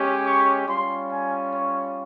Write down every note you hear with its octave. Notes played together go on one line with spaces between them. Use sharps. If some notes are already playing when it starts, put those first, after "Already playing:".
Already playing: G#3 C#4 G4
C#6
G3 C#4 F4 C6
G#5
C#5